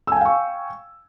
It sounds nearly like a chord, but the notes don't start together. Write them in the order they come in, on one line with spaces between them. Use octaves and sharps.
E6 G#5 G5 F5 C#6